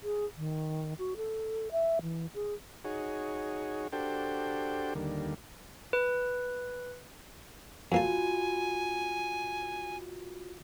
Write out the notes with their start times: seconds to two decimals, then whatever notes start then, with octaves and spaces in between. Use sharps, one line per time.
0.04 G#4
0.37 D#3
0.99 F#4
1.17 A4
1.72 E5
2.02 E3
2.35 G#4
2.85 D#4 F#4 G#4 C#5
3.93 D4 F#4 G4 A4 C5 G5
4.95 D#2 D3 G3 A#3
5.93 B4
7.92 F2 A#3 F4 F#4 G#5 A5